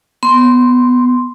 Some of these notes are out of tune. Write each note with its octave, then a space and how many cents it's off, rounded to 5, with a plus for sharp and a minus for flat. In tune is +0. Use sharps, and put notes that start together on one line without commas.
B3 +5 C6 +0